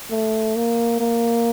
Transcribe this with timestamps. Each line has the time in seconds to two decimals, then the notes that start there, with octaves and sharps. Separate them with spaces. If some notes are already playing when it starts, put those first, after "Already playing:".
0.10 A3
0.56 A#3
1.00 A#3